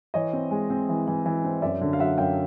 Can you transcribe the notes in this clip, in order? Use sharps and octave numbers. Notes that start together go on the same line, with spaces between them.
E3 C#5 D#5
C4
G#3
C4
E3
E3
E3
C4
F#2 D5 E5
D3
F5
F#3 E5 F#5
F#2 F5 G5